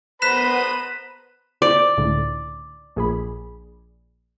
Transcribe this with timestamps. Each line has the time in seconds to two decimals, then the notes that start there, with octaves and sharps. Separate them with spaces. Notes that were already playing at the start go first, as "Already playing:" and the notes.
0.22 B3 C5 A#5 B5 F#6 B6 D#7 E7
1.62 C5 D5
1.98 C#2 A2 D3
2.96 A#1 G#4 B5